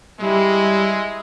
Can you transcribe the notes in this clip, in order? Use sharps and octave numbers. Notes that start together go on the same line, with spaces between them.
G3 G#3 E4